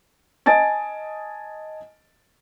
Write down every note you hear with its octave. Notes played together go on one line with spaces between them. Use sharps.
D#5 G#5 A5 A6 D7